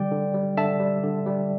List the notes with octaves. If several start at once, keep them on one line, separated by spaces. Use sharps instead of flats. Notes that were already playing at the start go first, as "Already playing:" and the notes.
Already playing: D3 G3 D5 G5
D3
G3
D3 E5 A5
G3
D3
G3